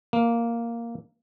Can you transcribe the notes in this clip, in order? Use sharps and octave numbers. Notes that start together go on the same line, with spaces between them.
A#3